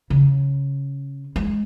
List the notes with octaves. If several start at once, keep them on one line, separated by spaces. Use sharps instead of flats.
C#3
G#3